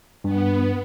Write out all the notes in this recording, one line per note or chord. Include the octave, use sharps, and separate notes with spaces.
G2 B3